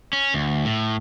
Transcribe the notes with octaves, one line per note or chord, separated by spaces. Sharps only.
C#4
D2
A2